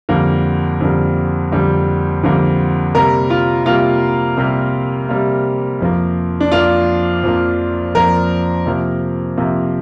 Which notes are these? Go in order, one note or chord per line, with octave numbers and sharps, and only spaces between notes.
F2 D3 G3 A#3
F2 D3 G3 A#3
F2 D3 G3 A#3
F2 D3 G3 A#3
C3 G3 A#3 A#4
F4
C3 G3 A#3 F4
C3 G3 A#3
C3 G3 A#3
F2 F3 A#3
D4
F2 F3 A#3 F4
F2 F3 A#3
F2 F3 A#3 A#4
C3 F3 A#3
C3 F3 A#3